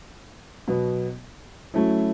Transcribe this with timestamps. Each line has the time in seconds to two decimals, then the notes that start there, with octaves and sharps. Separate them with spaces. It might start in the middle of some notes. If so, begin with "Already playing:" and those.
0.68 B2 F#3 B3
1.74 F#3 A3 C#4 E4